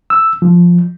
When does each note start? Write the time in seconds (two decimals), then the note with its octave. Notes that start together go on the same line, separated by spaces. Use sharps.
0.10 E6
0.42 F3